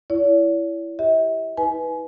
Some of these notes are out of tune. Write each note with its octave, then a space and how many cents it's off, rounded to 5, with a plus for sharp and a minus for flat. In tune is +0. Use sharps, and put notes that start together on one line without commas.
E4 +15 C#5 +45
G4 +5 E5 -40
E4 -45 B4 +0 G#5 +30